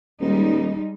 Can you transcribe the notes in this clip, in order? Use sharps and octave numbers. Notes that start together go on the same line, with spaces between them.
D#1 G3 G#3 D#4